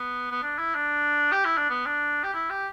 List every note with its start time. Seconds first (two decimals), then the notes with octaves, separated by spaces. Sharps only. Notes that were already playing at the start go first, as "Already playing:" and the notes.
Already playing: B3
0.31 B3
0.43 D4
0.59 E4
0.75 D4
1.33 G4
1.45 E4
1.57 D4
1.70 B3
1.86 D4
2.24 G4
2.34 E4
2.50 G4